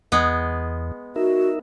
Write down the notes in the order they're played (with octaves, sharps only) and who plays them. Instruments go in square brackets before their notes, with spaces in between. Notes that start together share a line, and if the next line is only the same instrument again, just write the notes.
[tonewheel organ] E2 [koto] G#3 B3
[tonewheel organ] D#4 A#4 E5 [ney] F#4